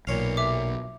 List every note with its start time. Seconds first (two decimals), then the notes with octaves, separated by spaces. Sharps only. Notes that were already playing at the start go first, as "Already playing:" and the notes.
0.07 B1 A#2 C#5 F5
0.37 E5 D6